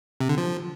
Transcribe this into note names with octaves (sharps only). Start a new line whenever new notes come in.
C3
D3
F3